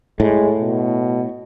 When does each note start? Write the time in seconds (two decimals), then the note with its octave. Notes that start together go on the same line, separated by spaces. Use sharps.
0.20 A2 G#3
0.60 B2